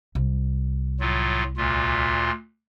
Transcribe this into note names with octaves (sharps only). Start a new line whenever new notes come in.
C2
A2 F#3 F4
D2 A#2 F4